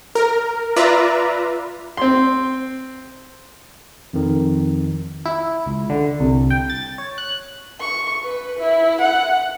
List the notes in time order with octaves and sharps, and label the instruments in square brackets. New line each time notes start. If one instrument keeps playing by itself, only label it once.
[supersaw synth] A#4
F4 B4 D5 E5 A#5
[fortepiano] C4 C6
[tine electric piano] F2 D#3
[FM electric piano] E4
C#2
D3
C2
G5
A6
C#5
F#6
[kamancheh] C#6
B4
E4
F#5